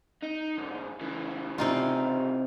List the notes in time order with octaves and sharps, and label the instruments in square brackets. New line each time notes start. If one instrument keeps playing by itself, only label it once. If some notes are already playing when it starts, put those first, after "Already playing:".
[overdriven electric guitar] D#4
D2 G#2
C#3 E3
[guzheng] C3 D#4 F4